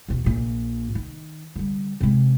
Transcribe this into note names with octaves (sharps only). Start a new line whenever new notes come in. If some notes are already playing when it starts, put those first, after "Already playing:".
E2 B2
A#1 A#2
D#3
D3 G3
C3 G#3